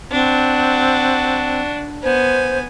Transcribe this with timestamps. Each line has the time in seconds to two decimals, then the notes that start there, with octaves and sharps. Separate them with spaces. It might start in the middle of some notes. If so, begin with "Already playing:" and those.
0.11 C4 D4 F#4
2.03 B3 C5 G#5